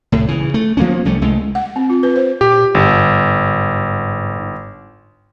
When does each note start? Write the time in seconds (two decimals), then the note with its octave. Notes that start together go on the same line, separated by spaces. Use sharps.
0.12 C2 A2
0.28 C#3 E3
0.54 A3
0.77 F3 A#3 B3 C#4
1.05 C2 G3 A3 C#4
1.22 C2 G#3 A3
1.55 F#5
1.76 C4
1.90 F4
2.03 B4
2.16 C5
2.41 A#2 G4
2.74 G1 G#2